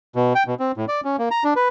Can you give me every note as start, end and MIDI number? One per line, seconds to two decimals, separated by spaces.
0.15 0.33 47
0.35 0.44 79
0.47 0.55 47
0.60 0.72 60
0.77 0.85 45
0.88 1.01 74
1.04 1.16 61
1.19 1.29 58
1.31 1.44 82
1.44 1.54 62
1.56 1.68 71